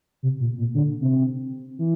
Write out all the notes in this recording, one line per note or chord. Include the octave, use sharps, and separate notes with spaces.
C3
A#2
A#2
D3
C3
E3